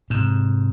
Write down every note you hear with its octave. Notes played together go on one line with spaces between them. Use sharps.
G#2 C3